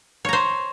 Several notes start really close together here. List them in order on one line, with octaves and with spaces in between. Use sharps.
C#5 A#5 C5